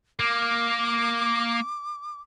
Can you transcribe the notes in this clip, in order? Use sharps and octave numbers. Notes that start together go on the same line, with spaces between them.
A#3 D6